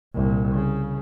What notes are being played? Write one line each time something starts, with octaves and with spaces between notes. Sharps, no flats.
C2 A#2
C#3